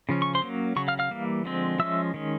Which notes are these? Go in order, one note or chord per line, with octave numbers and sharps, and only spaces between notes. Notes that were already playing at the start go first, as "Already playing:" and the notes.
C#3 F3 C#4
C#6
C5 C6
F#3 A#3 C#4
C#3 F#3 C#6
F5 F6
F5 F6
E3 G3 A#3
D3 F3 G#3 C4
F3 G#3 C#4 E5 E6
D#3 G#3 C#4